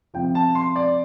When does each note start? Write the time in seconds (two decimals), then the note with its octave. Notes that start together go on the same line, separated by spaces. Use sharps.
0.14 C3 F3 G5
0.35 A5
0.55 C6
0.76 D5